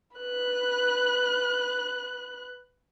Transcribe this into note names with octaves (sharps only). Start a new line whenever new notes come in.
B4 F#6